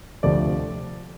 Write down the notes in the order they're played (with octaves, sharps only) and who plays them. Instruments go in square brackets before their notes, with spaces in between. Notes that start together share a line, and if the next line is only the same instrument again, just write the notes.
[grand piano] D2 C3 F3 A3 D5